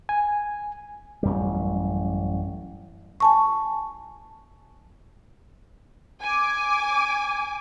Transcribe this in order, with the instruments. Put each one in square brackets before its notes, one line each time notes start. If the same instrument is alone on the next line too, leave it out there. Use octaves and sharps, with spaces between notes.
[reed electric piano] G#5
[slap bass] A1 F#2 G3
[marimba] G#5 A5 C#6
[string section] G#5 D6